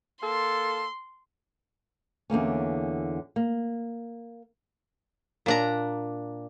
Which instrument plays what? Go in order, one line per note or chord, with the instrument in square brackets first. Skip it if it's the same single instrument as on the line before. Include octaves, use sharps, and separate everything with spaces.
[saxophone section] A#3 A4 [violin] C6
[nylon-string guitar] E2 D3 A#3 C#4
A#3
[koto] A#2 D4 A#5